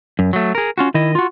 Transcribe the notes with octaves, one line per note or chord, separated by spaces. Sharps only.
F#2
F#3 A3
G#4 A#4
C#4 F4 F#4
D#3 E4 D#5
F4 F#4